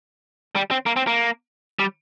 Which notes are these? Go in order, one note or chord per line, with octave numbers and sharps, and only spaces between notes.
G3
C4
A#3
C4
A#3
G3